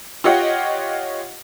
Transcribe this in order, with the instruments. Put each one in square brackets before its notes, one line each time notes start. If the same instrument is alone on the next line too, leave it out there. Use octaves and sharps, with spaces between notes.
[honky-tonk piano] F4 G4 C#5 D#5 F#5 G5